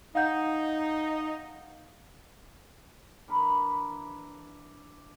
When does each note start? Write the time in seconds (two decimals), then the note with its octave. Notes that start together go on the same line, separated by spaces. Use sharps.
0.15 D#4 F5 F#5 G6
3.28 E3 D4 A#4 B5